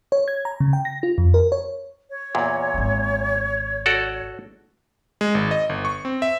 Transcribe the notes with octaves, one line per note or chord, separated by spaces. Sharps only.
C#5
G#6
A#5
C#3
G5
A#6
F4
F2
A#4
C#5
C#5
E2 A#2
G#1 D4
F#4 A4 D5
G#3
G#1
D#5
G1
C#6
C4
E5